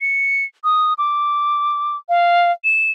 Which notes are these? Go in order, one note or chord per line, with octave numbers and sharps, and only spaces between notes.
C#7
D#6
D6
F5
E7